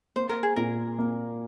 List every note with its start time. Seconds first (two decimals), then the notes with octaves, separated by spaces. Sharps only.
0.16 A#3 C5
0.29 A#4
0.43 G#4
0.56 A#2 A#4
0.99 A#3